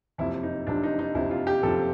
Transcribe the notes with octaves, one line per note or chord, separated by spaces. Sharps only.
F#1 F2 C3 F3 E4
D#4
F#1 F2 C3 F3 D4
D#4
D#4
F#1 F2 C3 F3 E4
F4
G4
F#1 F2 C3 F3 A4